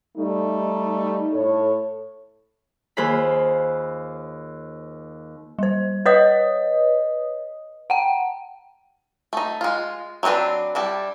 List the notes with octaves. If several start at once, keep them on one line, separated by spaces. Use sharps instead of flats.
G3 A3 D#4
A2 A4 C#5
D#2 F4 G#4 C5 B5
G3 C5
B4 C#5 D#5 D#6
F#5 G5
A3 D#4
G#3 F4
F#3 A3 C4 D4 B4
G3 D4 E4